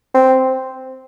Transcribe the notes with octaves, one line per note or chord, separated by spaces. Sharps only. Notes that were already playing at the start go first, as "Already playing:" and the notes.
C4